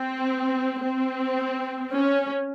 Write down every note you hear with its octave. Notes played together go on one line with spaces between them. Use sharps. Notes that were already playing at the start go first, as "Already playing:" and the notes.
Already playing: C4
C4
C#4